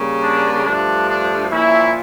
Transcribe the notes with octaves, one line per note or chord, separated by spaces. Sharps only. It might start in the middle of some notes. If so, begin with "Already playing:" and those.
Already playing: C#3 G3 A#3
D4
G2 F3 A3 D4
D4
A#2 F3 A#3 C#4 E4